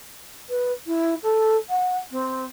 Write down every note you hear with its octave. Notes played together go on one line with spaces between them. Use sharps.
B4
E4
A4
F#5
C4